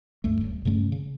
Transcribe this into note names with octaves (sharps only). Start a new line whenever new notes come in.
C#2 G2 A3
D#1
G2 C#3 A3 C#4
C#3